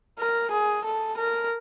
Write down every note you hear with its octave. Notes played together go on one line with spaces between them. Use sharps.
A#4
G#4
A4
A#4